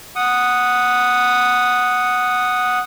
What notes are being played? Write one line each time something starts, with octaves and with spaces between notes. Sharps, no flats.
F#5 D#6